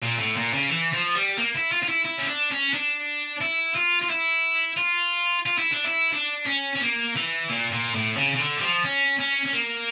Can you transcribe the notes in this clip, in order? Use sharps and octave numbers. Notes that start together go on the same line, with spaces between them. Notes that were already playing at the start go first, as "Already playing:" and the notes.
A#2
A2
A#2
C#3
E3
F3
G3
A#3
E4
F4
F4
E4
E4
C#4
D4
C#4
D4
E4
F4
F4
E4
F4
F4
E4
D4
E4
D4
C#4
C#4
A#3
E3
A#2
A#2
A2
C#3
C#3
D3
G3
F3
C#4
C#4
C#4
A#3